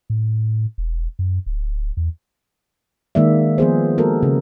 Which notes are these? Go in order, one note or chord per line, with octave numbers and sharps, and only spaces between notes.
A2
E1
F#2
D1
E2
D#3 G#3 A#3 D5 E5
F3 B3 G#4 C5
G#3 A#3 F#4 A4 A#4
C#3